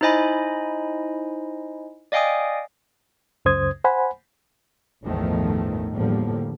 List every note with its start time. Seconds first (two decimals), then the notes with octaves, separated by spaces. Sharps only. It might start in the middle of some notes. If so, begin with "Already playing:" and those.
0.01 D#4 E4 C5 D#5 G#5 B5
2.12 D5 D#5 F5 G5 G#5 D#6
3.45 C#2 F#2 C#3 C5 D#6 G#6
3.84 C5 F#5 G#5 B5
5.04 A1 E2 G2 D#3 F3 A3
5.94 E2 A2 D3 F3 G3 A#3